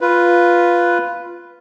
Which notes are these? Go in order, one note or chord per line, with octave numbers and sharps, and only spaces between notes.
F4 B4